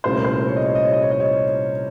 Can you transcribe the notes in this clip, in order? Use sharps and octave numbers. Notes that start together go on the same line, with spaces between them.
C2 A#2 A3 C#4 C5
A#4
C5
C#5
D#5
C#5
D#5
C#5
D#5
C#5
D#5
C#5